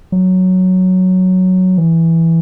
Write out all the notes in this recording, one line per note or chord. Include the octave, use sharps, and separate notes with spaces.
F#3
E3